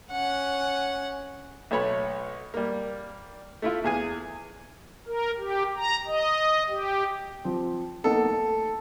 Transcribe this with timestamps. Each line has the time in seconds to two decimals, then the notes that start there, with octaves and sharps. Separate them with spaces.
0.11 C#4 F#5
1.71 B1 A3 C#5 B5
2.54 G3 A#3
3.62 A3 E4 F4
3.84 E2 G#4 G#5
5.07 A#4
5.38 G4
5.77 A#5
6.07 D#5
6.69 G4
7.44 F3 C4
8.04 A#3 B3 D#4 A4
8.26 A3